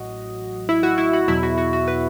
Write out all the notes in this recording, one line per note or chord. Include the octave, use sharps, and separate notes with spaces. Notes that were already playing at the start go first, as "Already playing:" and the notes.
Already playing: A1 A2 F#3 F#4 D#5
E4
F#4
E4
F#4
E2 B2 F#3 E4
F#4
F#4
F#4
B4